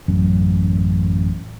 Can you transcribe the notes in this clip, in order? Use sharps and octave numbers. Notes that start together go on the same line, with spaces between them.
A1 F#2